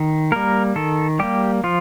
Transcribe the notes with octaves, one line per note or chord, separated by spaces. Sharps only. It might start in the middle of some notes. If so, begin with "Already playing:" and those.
Already playing: D#3
G3 A#3 A#4
D#3 A4
G3 A#3 G4
F3 F4